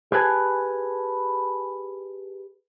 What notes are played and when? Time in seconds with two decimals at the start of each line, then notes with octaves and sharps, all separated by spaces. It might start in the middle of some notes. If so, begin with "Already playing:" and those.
0.12 G4 G#4 B4 G#5 A5